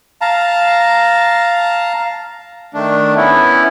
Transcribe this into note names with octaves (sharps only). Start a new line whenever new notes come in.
F5 A5 A#5
D#3 A3 D4
B3 C#4 E4